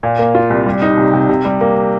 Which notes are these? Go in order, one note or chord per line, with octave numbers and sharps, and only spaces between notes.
A#2
A#3
F4
C2
G3
D#4
C3
C3
C3
G3
A#3